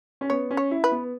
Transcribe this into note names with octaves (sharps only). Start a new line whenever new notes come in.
C#4
B3 C#5
C#4
C#5
E4
B4
B3